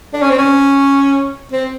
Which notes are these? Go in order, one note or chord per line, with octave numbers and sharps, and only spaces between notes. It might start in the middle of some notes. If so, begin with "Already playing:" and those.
D4
C#4
C4
C#4
C4